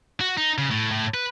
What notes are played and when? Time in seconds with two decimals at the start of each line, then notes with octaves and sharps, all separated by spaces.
0.21 F#4
0.37 D#4
0.58 C#3
0.71 A2
0.92 A2
1.14 B4